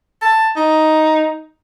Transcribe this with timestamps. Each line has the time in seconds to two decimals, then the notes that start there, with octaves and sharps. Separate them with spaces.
0.22 A5
0.56 D#4